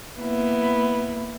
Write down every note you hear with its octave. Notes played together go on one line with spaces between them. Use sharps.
A#3 B3 E4